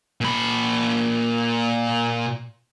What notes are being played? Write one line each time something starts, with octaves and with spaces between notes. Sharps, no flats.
A#2 B5